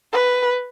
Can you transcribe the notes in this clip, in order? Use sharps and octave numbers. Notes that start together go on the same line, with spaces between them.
B4